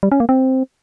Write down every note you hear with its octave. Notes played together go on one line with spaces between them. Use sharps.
G3
C#4
A#3
C4